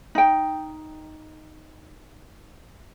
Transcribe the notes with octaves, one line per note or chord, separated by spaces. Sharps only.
D#4 G5